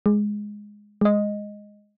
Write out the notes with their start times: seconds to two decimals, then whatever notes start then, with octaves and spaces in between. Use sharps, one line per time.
0.06 G#3
1.01 G#3 D#5